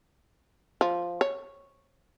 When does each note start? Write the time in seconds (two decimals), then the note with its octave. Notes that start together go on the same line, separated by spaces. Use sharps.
0.81 F3
1.21 C#5